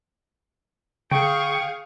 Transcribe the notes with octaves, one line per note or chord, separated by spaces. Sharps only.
D3 G#4 F5 G5 C#6